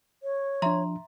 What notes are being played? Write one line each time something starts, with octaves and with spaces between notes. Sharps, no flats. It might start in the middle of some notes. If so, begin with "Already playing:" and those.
C#5
F3 D4 E5 A#5 C6